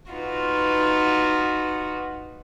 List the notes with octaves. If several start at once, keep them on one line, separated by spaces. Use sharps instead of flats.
D#4 F4 F#4 B4